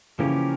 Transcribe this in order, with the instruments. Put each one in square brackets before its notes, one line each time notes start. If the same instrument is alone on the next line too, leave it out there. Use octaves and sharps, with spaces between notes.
[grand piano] C#3 E3 [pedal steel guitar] F3 A#3 C#4 G4 A#4